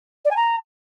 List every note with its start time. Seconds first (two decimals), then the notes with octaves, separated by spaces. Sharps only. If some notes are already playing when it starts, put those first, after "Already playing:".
0.25 D5
0.31 G#5
0.37 A#5